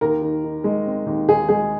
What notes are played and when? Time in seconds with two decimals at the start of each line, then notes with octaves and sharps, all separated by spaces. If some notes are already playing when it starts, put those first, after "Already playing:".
0.01 D#2 A#4
0.22 D#3
0.44 D#3
0.64 G#3
0.86 C4
1.06 D#2
1.28 D#2 G#4
1.49 G#3 G#4